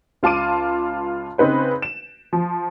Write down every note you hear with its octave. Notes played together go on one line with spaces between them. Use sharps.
C#2 F4 A5 D6 D#7
C#3 C4 D#4 B4 C5
E7
F3